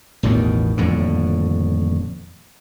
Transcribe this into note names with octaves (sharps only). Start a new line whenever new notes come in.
A1 E2 B2 D#3
D#1 F2 A2 D3